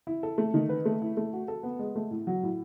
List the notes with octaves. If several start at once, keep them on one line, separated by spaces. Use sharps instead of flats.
E4
A4
A3
D#3
B4
A3
E4
A3
F#4
A4
B3
G#3
A3
A2
F#3
A2